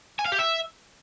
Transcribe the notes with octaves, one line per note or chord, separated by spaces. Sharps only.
G#5
F5
G4
E5